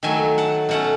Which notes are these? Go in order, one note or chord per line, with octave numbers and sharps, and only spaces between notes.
D#3 F#3 A3 E5 G#5
F#5 A5
B2 A3 C#4 F#5 A5